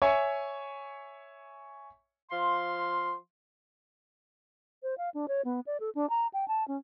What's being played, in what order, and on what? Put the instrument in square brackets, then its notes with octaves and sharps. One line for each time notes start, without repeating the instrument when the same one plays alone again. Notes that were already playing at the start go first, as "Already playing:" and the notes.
[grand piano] C#5 E5 G#5 C#6
[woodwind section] F3 F5 C6
[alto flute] C5
F5
D4
C#5
B3
D5
A4
D4
A#5
G5
A5
C#4